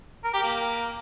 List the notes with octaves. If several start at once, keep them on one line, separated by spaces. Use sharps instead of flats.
A#4
G4
A#3